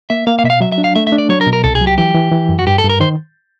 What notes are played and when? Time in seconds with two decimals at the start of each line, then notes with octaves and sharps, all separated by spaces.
0.10 A#3 E5
0.27 A#3 F5
0.39 F5
0.44 B2 E5
0.50 F5
0.61 F#3 E5
0.72 E5
0.78 D4
0.84 F5
0.96 A3 E5
1.07 E5
1.12 D4
1.18 D5
1.29 F#3 C#5
1.41 A#4
1.46 B2
1.53 A#4
1.64 C2 A4
1.75 G#4
1.81 F#3
1.87 G4
1.98 E3 G4
2.15 E3
2.32 E3
2.49 F#2
2.59 F#4
2.67 G2 G4
2.78 A4
2.84 G2
2.89 A#4
3.00 D#3 C5